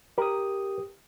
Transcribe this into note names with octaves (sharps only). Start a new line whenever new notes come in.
G4 A#4 D#6